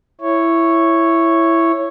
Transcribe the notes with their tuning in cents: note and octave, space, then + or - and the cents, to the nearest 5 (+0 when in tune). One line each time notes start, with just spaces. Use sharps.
E4 +10 C#5 -5